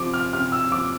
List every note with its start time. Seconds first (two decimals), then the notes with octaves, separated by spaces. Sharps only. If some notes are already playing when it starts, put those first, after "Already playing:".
Already playing: C3 F3 D6
0.13 F6
0.33 C3 F6
0.52 E6
0.72 F3 D6